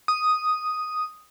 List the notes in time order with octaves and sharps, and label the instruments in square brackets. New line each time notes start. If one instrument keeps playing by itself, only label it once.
[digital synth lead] D#6